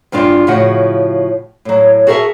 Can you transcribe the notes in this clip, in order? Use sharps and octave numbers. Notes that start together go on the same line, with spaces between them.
E2 G2 D4 F4
A2 C#3 F3 F#4 F#5
A2 F#3
F#4 G#4 A#4 C5 E5 A5